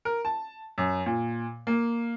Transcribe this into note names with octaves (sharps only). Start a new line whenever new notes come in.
A#4
A5
F#2
A#2
A#3